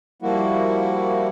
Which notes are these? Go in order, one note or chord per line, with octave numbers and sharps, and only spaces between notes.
F3 G3 A#3 E4 F#4